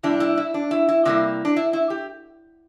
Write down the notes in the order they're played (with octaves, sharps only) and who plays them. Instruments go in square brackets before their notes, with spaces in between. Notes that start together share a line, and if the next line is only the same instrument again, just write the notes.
[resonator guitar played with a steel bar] C3 G3 D4 E4
E4
E4
D4
E4
E4
C3 G3 A#3 E4
D4
E4
E4
G4